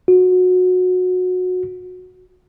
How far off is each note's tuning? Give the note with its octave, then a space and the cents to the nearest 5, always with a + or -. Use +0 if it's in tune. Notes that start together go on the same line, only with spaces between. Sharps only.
F#4 -20